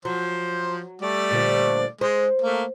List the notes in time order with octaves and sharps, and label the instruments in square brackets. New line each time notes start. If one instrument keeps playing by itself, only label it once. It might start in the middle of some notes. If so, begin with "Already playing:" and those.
[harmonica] F3 C5 [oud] F#3
[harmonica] G3 A3 D5
[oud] A#2 D3 F3
[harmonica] G#3 [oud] C5
[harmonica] A3 A#3